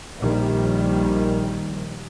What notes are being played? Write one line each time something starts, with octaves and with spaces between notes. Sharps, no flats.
A#1 D#3 G3